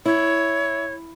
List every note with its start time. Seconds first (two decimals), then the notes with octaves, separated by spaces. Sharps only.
0.06 E4 C#5